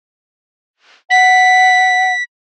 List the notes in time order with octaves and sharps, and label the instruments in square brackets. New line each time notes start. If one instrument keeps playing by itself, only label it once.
[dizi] F#5 [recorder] B6